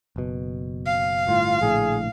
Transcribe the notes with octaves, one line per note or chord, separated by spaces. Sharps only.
F#1 B2
F5
G1 A2 F4
A#1 A2 D3 G#4